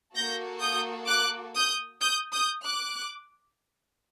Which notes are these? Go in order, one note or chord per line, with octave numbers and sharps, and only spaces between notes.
A#3 F#4 A4 G6 A#6
D#6 G6
D6 F#6
D#6 G6
D#6 G6
D#6 G6
D6 F#6